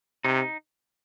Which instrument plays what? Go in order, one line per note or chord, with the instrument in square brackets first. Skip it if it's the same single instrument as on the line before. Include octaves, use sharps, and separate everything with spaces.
[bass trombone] C3 [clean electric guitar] D#4